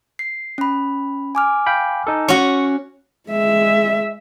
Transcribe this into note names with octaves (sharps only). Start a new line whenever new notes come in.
C7
C#4 B5
G#5 D6 F6
F5 G5 B5
D#4 A4
C#4 F#4 C#6
G#3 E5